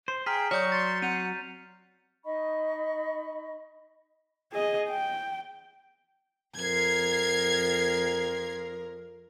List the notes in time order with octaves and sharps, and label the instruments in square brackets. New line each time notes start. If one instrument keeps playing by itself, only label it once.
[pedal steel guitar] C5 [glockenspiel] C7
[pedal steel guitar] G#4 [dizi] G5 [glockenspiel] A#5 F6 B6
[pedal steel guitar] F#3 F#4 [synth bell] C#5 D5 C#6 [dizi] D#6 [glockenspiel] F6 G6
[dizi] C6 [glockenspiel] A6
[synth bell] C4 [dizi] F#5 [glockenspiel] D#7 F7
[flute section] D#4 D#5 B5 C#6
[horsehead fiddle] G#4 D#5
G5
[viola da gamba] F2 A#4 [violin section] G#6 C7